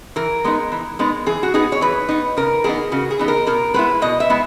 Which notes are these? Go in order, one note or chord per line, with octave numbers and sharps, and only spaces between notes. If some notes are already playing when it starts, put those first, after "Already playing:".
E3 A#4
G#3 B3 D#4
E3
G#3 B3 D#4
E3 G#4
F#4
B3 D#4 G#4
C#5
E3 B4
B3 D#4
C#3 A#4
E3 B3 D#4 G#4
C#3 F#4
G#4
E3 B3 D#4
A#4
B2 A#4
G#3 B3 E4 B4
B2 D#5
E5
G#3 B3 E4